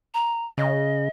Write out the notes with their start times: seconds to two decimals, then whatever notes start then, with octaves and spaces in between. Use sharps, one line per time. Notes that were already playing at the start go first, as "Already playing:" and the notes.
0.14 A#5
0.58 C#3 D#5